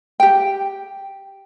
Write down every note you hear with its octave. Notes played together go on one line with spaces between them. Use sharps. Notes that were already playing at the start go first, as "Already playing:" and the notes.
G4 G5